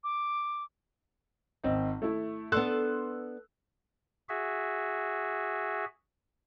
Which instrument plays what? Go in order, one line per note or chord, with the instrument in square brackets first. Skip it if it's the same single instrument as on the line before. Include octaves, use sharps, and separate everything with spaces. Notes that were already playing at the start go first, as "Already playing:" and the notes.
[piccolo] D6
[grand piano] G#1 C4 D#4
A3 E4
[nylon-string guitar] B3 D4 A4 [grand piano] C6 E6 F#6
[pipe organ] F#4 G#4 E5